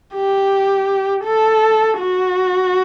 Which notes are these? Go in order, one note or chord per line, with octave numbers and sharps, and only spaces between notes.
G4
A4
F#4